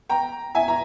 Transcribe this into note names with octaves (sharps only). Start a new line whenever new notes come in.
G5 A#5
E5 G#5
A#5